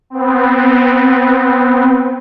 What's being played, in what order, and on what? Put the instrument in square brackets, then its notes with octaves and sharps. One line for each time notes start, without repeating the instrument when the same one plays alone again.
[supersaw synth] B3 C4